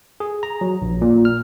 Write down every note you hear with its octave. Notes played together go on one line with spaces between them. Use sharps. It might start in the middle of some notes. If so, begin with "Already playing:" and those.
G#4
A#5
F#3
A#1
A#2
F6